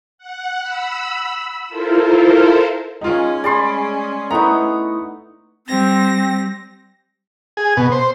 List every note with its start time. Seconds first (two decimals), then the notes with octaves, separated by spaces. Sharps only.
0.18 F#5
0.61 B5 E6
1.68 E4 F4 A4 A#4 C5
3.01 G#3 C#4 D#4 F4
3.44 G#4 D5 B5 C6
4.31 A3 B3 D#4 E4 A#5 C#6
5.67 G3 C4 A#6
7.57 G#4
7.77 B2
7.92 C5